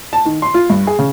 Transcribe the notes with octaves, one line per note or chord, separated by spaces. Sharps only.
A5
D#3
C6
F4
G2
G#4
C#3